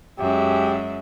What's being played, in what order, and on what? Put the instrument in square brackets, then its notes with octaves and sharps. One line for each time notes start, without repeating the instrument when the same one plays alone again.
[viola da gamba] F#2 G#3 [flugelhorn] G4 [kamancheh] E5